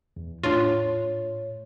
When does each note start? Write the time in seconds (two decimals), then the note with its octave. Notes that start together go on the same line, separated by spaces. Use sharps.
0.16 E2
0.43 A2 D4 F4 C#5